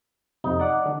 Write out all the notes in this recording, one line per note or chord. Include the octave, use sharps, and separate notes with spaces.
F2 C3 D#4
D5 F#5 D6
D3 D4